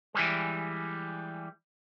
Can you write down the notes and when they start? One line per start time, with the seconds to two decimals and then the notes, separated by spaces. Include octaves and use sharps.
0.14 E3 G3 G#3